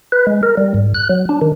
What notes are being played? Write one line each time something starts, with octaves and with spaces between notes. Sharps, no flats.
B4
G#3
A#4
G3
G#2
F#6
F#3
D4
D#3